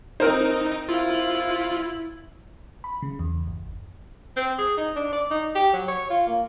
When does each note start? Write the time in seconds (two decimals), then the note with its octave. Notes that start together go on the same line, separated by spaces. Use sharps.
0.20 C4 D#4 A#4 C5
0.89 E4 F4
2.84 B5
3.02 C#3
3.19 E2
3.47 G1
4.37 C4
4.59 G#4
4.77 D#4
4.96 D4
5.13 D5
5.31 D#4
5.55 G4
5.73 F#3
5.88 C#5
6.10 F4
6.27 A#3